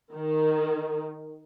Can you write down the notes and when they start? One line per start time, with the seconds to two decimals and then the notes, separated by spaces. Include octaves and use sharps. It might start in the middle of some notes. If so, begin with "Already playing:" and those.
0.14 D#3